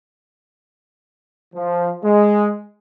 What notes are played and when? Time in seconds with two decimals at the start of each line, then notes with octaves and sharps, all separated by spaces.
1.55 F3
2.04 G#3